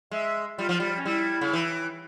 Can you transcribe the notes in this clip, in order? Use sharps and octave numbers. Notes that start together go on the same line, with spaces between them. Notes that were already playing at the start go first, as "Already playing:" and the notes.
G#3 E5
G3 F4
F3
G3
C#4
G3 E4
C#3
E3